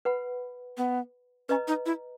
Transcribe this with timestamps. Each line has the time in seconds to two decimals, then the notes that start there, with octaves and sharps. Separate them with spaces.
0.05 B4 F#5 B5
0.77 B3
1.49 C#4 B4 D#5 A#5
1.68 D#4
1.86 E4